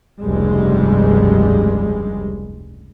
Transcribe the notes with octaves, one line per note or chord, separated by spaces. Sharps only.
F1 C#2 G2 G3 G#3